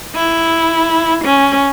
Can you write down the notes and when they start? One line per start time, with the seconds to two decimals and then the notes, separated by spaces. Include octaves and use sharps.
0.15 E4
1.24 C#4